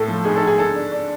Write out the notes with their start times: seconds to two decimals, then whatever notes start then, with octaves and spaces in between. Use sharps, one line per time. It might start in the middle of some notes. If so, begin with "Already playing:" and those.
Already playing: A2 A3 A4
0.08 F3
0.25 G#2 G#4
0.36 A4
0.42 G#2
0.47 G#4
0.58 D3 A4
0.75 D4
0.92 D4